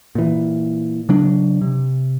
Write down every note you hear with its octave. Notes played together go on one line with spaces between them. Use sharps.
A#2 E3
C#3 F#3 D4
C3